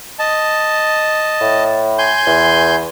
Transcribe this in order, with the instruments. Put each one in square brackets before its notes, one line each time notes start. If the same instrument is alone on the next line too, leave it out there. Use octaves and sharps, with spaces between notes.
[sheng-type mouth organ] D#5 A5
[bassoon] A2
[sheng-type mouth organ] G#5 C6 G6
[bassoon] E2